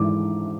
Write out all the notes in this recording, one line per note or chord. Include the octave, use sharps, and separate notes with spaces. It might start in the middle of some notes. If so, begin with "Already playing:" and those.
Already playing: G#2 E3 D6